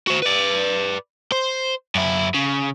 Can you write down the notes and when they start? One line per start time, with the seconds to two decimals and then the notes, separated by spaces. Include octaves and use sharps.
0.07 F#4 C5
0.22 B4 D5
1.32 C5
1.95 F#2 E4
2.34 C#3